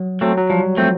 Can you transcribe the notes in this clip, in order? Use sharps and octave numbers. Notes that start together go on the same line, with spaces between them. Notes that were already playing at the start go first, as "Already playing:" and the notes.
Already playing: F#3
F#3 A3 C4
F#3
F3 G3
F3 A3 C4